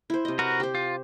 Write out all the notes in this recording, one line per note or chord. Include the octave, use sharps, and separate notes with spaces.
E4 C5
C3 D#5
F#4 A#4 B4
G4 C5
F4